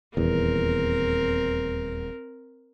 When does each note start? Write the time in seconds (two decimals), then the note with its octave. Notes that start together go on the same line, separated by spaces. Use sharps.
0.17 D#1 E2 C4 A#4